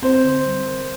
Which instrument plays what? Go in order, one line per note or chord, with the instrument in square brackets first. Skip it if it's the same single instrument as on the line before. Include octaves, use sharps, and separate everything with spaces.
[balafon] C4 [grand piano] C5
[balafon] D3
G3
A#4